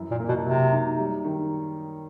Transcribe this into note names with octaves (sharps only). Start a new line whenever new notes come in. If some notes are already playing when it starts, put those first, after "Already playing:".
Already playing: F#2 E3
A#2
A#3
B2
C3 F#3
D#4
G3
D#3